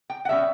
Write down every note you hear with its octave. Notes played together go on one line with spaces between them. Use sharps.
G5
F#5
B2 G3 C#4 E5